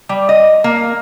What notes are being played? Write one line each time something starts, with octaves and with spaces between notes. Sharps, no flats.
G3
D#5
A#3